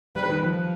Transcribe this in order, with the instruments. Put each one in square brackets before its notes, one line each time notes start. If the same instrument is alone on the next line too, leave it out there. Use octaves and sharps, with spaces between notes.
[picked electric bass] G3 [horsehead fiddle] B4
[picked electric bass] D#3
F3